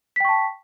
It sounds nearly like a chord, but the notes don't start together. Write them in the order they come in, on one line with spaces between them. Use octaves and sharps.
B6 G5 C#6 A5